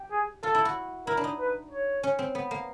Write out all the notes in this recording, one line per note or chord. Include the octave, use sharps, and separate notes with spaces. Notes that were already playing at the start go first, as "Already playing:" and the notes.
Already playing: G4
G#4
F4 A4
E4
F#4
E4 A#4
D4
D#4
B4
C#5
C#4
C4
B3
A#3